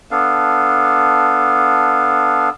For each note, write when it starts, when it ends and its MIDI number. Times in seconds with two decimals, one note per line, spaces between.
0.11 2.49 59
0.11 2.49 62
0.11 2.49 69
0.11 2.49 77